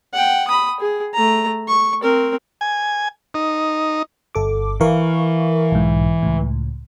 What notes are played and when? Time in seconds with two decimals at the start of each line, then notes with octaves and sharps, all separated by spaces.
0.13 F#5 G5
0.48 B5 D#6
0.80 G#4
1.14 A3 A#5
1.68 C#6
2.02 C4 A#4
2.61 G#5
3.34 D#4
4.35 G1 A4 D6
4.81 E3 A#4 F5 C#6
5.72 B1 G#2
6.22 C#2 A2